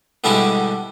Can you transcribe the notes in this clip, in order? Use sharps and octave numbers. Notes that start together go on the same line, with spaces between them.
B2 D3 G3 G#3 E4 G4